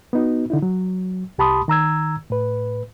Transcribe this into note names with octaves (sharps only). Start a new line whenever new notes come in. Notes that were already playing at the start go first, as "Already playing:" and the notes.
B3 D#4 F#4
D3 D#4 E4
F#3
C2 G4 A5 B5 C6 D#6
D#3 A#5 E6 G#6
A2 B4